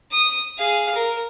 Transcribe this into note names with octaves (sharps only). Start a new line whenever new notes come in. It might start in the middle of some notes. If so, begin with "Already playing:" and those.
D#6
G#4 F5
A#4